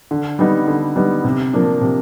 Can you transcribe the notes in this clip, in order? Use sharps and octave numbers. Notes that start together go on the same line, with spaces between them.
D3
G3 B3 D#4
D3
G3 B3 D#4
C3
F3 A#3 D4
C3